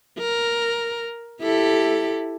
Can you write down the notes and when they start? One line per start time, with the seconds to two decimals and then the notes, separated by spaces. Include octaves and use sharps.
0.19 A#4
1.42 E4 G4 A4